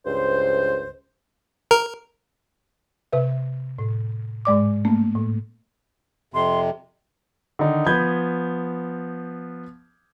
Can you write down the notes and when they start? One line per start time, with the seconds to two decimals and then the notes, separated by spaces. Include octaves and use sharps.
0.05 C#2 G2 C5
1.71 A#4
3.13 C3 B4 E5
3.79 A2
4.45 G#2 G#3 D5 D6
4.85 A3 A#3 C#4
5.15 A2
6.34 F2 C3 C6
7.59 D3 D#3 D#4
7.86 F3 B3 B5 G6 G#6